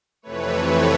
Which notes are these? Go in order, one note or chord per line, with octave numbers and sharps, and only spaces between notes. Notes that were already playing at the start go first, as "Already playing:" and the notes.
F2 C3 E3 A3 B4 C#5
B4 C#5